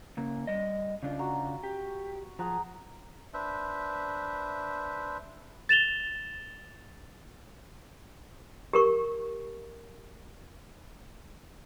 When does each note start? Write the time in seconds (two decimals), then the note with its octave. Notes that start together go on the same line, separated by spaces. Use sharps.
0.17 C#3 A#3
0.47 G3 D#5
1.03 C#3 D4 F4
1.19 F#4 A#5
1.64 G4
2.39 F3 G#4 F#5 A#5
3.34 D4 B4 C5 E5
5.69 A6 E7 F7 G7
8.73 G4 A#4 C#6